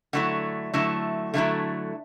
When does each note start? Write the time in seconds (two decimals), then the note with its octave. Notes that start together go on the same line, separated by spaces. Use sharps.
0.13 D3 F#3 A3 E4 F#5
0.73 D3 F#3 A3 E4
1.34 D3 F#3 A3 E4 E5